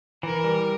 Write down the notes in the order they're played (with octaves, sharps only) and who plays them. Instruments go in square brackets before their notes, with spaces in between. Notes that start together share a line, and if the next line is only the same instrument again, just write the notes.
[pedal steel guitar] E3 [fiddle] A#4
[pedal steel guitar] G3